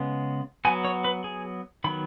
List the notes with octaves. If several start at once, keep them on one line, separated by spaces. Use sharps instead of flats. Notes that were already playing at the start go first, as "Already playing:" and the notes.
Already playing: C#3 G#3 B3
F#3 B3 G#5
C#5
B4
G#4
D#3 F#3 B3 B5